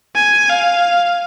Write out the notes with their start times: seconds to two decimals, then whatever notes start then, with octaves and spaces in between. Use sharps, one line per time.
0.16 G#5
0.50 F5